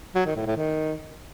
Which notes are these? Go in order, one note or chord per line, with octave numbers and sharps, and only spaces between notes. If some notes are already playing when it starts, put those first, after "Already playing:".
F#3
D#3
A2
A2
D#3